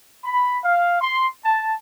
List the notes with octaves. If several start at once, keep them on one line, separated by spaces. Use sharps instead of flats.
B5
F5
C6
A5